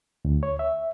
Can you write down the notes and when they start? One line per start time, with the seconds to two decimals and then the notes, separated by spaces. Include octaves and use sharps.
0.25 D2
0.43 C#5
0.59 E5